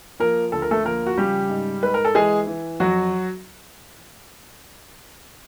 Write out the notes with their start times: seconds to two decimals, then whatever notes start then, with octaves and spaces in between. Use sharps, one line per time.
0.20 F3 A#3 A#4
0.52 D2 A4
0.62 A#4
0.71 A3 A4
0.85 F3 A#3 A#4
1.06 F#4
1.17 C#3 G3 G4
1.49 G#2
1.83 G#2 B4
1.94 A#4
2.05 A4
2.15 E3 G#3 G#4
2.47 E3
2.80 F2 F#3 F#4